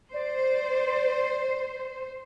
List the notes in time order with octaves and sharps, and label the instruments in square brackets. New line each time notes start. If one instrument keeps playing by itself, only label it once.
[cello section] C5 [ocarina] D5